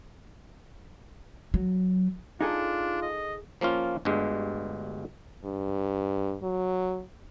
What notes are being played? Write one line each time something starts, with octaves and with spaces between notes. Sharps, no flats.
F#3
D4 D#4 F4 G#4 A4
D#5
F3 A#3 C#4 F4
G1 D2 G2 G#3
G2
F#3